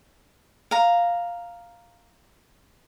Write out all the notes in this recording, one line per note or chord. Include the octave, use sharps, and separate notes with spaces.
F5 A#5